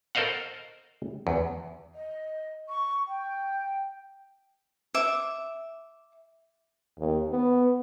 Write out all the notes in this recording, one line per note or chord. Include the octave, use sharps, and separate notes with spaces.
A4 A#4 C5 D#5 F5 F#5
E2
D#5
C#6
G5
E5 D6
D#2
B3